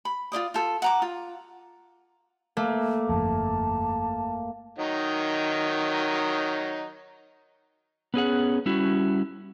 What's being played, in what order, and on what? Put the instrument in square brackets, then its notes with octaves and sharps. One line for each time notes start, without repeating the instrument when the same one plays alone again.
[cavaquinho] B5
F4 C5 D5 D#6
F4 A4
F#5 A#5 D6
F4
[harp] A3 [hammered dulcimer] A#3
[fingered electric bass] G1 F2 [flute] A5
[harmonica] D#3 F#3 D#4
[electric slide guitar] B3 C#4 G#4 F#5
G3 C#4 E4 F#4